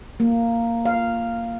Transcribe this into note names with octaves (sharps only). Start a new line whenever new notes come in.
A#3
F5